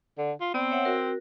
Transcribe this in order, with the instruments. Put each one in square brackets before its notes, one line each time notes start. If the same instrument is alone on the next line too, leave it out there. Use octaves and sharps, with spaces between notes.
[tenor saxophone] D3
F4
[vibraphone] B3 D5 [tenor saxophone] C4
[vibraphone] C#5 E5 F#5
F#4 A#4